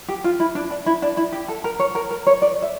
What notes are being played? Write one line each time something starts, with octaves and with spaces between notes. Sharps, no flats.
G4
F4
E4
D4
D4
E4
D4
E4
G4
A4
A#4
C#5
A#4
A#4
C#5
D5
E5